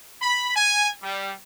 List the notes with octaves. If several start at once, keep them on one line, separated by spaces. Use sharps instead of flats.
B5
G#5
G3